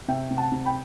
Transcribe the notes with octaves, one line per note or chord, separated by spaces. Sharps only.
C3 E5 G5
C3
F#5 A5
C3
G5 B5